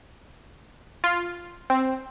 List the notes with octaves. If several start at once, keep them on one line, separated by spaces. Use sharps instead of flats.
F4
C4